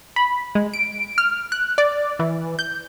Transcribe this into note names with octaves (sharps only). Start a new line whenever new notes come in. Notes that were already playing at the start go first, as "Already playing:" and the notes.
B5
G#3
D7
F6
F#6
D5
E3
G6